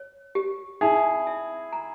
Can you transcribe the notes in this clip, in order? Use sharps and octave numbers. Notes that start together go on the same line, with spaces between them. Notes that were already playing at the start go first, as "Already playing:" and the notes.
Already playing: C#5
G4
D#4 E4 G#4
E5
A#5